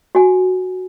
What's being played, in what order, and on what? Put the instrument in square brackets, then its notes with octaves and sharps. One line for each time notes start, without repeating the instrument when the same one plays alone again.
[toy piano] F#4 G#5